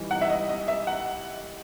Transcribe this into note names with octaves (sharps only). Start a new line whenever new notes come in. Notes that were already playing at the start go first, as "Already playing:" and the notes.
Already playing: E3 G3 D#4
F#5
E5
D#5
D#5
E5
F#5